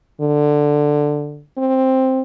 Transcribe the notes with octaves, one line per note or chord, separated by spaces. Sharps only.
D3
C4